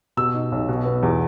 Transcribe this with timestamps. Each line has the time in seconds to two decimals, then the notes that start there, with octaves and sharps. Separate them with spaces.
0.17 B2 E6
0.34 D#4
0.52 B1
0.68 B2
0.85 B3
1.03 E2